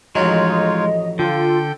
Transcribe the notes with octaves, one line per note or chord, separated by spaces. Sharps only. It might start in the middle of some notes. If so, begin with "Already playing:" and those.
A1 F2 F#3 G#3 D#4 F4 C#5 D#5
D3 F4 A4 G5 G6